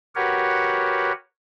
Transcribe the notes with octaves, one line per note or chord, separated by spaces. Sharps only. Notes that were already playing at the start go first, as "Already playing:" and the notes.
F#4 G4 A#4 B4 C#5 F#5